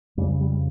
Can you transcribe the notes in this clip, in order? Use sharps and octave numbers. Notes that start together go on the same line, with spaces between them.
F2 C#3 G3
G3